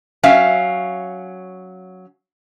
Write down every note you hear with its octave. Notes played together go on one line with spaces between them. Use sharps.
F#3 C#4 E5 F5